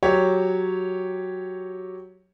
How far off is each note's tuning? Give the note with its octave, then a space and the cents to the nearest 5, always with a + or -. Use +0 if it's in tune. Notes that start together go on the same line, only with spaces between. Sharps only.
F#3 +0 G4 +0 C#5 +0